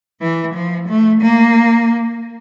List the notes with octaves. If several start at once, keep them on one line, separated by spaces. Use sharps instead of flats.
E3
F3
A3
A#3